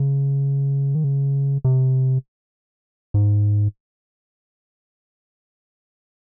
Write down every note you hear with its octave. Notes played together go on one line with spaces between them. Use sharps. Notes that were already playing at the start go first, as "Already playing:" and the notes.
Already playing: C#3
D#3
C#3
C3
G#2